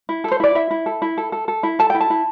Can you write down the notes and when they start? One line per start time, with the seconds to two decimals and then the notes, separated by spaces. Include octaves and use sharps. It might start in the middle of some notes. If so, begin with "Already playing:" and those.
0.09 E4
0.24 A4
0.31 C5
0.40 E4 D5
0.55 E4 E5
0.71 E4
0.86 A4
1.02 E4
1.17 A4
1.32 A4
1.48 A4
1.63 E4
1.79 A4 A5
1.90 E4 G5
2.01 A5
2.10 E4